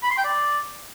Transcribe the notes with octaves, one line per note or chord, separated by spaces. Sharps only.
B5
C6
G5
D5